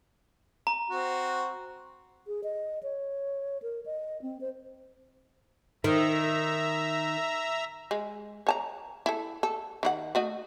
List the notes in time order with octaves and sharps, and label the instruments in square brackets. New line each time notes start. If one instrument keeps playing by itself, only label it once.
[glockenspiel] A#5
[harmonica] C4 F#4
[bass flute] G#4
D#5
C#5
A#4
D#5
C4
C5
[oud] D#3 [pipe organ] E5 A#5
[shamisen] G#3
C#5 A5 A#5
E4 A4
A4
D#3 E4 F#5
A3 F#4 D#5